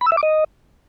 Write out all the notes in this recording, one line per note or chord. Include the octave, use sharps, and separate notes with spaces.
B5
E6
E5
D6
D#5